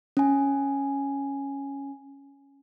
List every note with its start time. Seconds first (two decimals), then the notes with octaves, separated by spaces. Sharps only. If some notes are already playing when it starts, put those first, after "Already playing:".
0.17 C#4 G#5